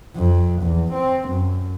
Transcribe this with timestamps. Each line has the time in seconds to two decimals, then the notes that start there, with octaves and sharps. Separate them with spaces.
0.16 F2
0.62 E2
0.94 C4
1.29 F#2